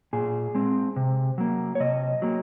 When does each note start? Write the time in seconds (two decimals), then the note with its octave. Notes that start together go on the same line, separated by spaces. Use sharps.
0.13 A#2 G#4
0.55 G#3 C4
0.96 C3
1.38 F#3 A#3
1.75 C#5
1.80 C3 D#5
2.22 F#3 A#3